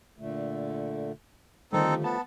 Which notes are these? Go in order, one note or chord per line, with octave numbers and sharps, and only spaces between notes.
A#2 D3 A3
D3 D#3 F3 G3 A3 C4 D#4 A4
B3 A5